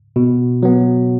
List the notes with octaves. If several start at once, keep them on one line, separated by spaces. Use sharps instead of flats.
B2
F#3 B3